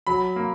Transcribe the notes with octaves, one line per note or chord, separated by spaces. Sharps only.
F#3 B5
A#3